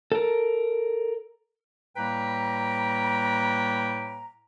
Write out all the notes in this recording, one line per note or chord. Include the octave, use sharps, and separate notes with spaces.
A4 A#4
A2 G3 A#3 B4 G5 A#5